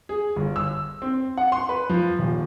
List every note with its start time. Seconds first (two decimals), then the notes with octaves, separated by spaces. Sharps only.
0.09 G#4
0.36 G1
0.56 E6
1.02 C4
1.37 F#5
1.52 C6
1.69 B4
1.90 F3
2.19 D#1